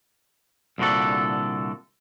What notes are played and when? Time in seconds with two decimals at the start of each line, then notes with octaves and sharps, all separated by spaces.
0.78 C2 A#2 D3 F#4 A4